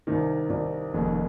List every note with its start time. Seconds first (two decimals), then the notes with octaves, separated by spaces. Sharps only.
0.07 C2 C3 D#3
0.49 C2 C3 D#3
0.94 F1 D#2 C#3 G#3